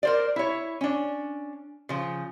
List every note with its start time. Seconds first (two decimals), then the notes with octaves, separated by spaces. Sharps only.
0.03 A#4 C5 D5
0.36 E4 C#5
0.81 C#4 D4
1.89 C#3 F3